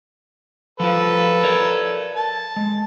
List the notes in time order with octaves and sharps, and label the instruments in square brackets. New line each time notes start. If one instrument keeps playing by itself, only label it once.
[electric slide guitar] F3 G3 F4 [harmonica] A4 B4
[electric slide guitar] A#4 C#5 D5
[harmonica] A5
[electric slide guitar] G#3